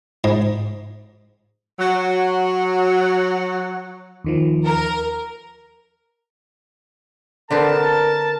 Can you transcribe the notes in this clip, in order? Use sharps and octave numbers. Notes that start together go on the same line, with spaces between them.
G#2
F#3 F#4
D#2 D#3 F3
A#4
D3 B3 C4 A#4 A5